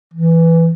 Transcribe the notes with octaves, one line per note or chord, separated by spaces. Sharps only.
E3